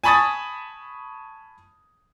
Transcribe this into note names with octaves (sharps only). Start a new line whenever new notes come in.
G#5 A5 B5 C#6 D#6 A6